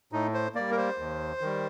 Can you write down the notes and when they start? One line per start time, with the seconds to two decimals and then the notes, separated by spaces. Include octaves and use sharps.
0.12 A2 D#4
0.34 C5
0.55 G3 A#3 D5
0.71 A#4
0.77 C5
0.98 D#2
1.41 D#3 G3